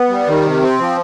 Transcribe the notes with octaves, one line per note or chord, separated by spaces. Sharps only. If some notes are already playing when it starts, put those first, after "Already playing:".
Already playing: B3
G3
D#3
C3
C4
F3